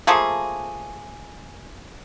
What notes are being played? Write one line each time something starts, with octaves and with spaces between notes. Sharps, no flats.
F3 A3 A#3 G#4